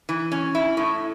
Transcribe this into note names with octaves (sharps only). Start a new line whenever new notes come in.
E3
C#4
E4
A2